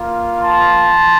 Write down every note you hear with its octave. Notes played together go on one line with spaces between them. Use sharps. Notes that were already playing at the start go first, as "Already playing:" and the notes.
Already playing: A#3 F4
A5 C6